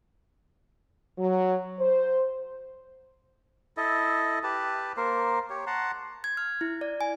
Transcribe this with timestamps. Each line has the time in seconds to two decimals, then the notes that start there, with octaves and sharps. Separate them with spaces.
1.18 F#3
1.79 C5
3.77 E4 A4 D#5
4.43 G4 B4 A5
4.97 A#3 A#4 C5
5.50 G4 C#5
5.67 F#5 A5 A#5 C6
6.24 G#6
6.37 F6
6.61 E4
6.81 D5
7.01 G#5